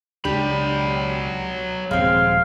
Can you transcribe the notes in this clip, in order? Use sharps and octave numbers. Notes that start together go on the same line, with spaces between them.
C#2 F#3 D4 G4 B5
D#1 F3 G#3 C4 F5